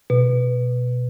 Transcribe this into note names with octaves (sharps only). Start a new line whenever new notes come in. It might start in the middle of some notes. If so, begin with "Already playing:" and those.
B2